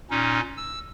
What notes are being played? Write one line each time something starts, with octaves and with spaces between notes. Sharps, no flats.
A#2 C#4 D#4
E6